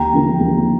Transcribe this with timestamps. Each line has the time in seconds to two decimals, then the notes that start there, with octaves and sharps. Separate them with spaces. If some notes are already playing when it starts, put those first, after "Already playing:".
Already playing: D#2 G5 A#5
0.13 D3 F3 A#3
0.40 D#2